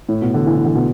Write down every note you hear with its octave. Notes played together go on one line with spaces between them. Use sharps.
A2
B2
D3
E3
E3
D3
B2